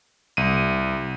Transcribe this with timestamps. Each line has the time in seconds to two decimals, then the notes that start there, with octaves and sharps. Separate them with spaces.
0.37 C2 D#7